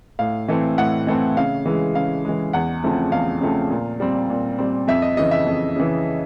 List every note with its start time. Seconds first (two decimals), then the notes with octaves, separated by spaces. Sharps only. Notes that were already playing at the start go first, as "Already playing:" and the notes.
0.19 A2 F5
0.48 E3 A3 C4
0.78 A2 F#5
1.07 E3 A3 C4
1.37 C#3 F5
1.66 E3 G#3
1.94 C#3 F5
2.25 E3 G#3
2.53 E2 F#5
2.84 C#3 F3 A3 C4
3.12 E2 F5
3.41 C#3 F3 A3 C4
3.70 A#2
4.00 G3 C4
4.30 A#2
4.59 G3 C4
4.88 F2 E5
5.02 D#5
5.17 C#3 E3 D#5
5.31 E5
5.46 F2
5.76 C#3 E3